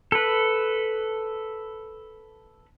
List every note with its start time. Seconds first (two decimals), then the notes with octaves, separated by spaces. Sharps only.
0.12 A4 B4